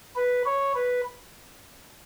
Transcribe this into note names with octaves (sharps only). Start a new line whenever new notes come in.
B4
C#5
B4